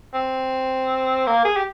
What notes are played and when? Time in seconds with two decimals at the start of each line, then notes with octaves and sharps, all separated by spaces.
0.14 C4
1.27 A#3
1.45 G#4
1.56 G4